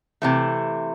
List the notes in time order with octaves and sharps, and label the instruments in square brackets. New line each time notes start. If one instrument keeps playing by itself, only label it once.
[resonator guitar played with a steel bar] C3 E3 A3